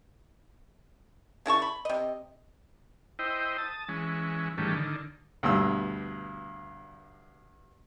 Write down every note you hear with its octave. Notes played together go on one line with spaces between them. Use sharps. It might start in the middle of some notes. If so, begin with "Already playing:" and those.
C#3 E4 A5 C#6
B5
C3 D#5
E4 C5 D#5 G5
A5 D#6
E3 G#3 C#4
G#2 D#3 E3 G3 A3 C#4
D3 D#3
D2 G2 B2 E6